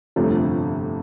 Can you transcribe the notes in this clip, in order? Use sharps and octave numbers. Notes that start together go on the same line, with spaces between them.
G1 F2 C3 F3 A3